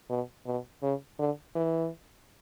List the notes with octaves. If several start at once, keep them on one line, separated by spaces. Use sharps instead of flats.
B2
B2
C#3
D3
E3